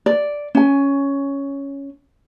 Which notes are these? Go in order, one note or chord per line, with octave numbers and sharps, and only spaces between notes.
D5
C#4 G#5